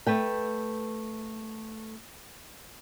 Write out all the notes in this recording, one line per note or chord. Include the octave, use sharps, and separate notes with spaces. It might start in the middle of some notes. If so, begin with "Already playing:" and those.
A3 B4 G5